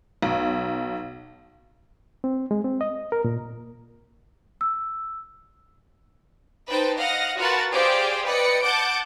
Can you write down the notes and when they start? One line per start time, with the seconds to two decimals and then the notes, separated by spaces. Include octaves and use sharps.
0.22 B1
2.24 C4
2.51 G#3
2.64 C4
2.81 D#5
3.12 A#4
3.25 A#2
4.61 E6
6.67 D#4 B4 C5 G5 A5
6.99 D#5 F5 F#5 A#6
7.37 F4 F#4 A#4 B4 F#5 A5
7.72 G4 G#4 C5 D5 F5 G5
8.25 B4 D5 D#5 G5 C#7
8.62 F#5 A5 D6 G6 D7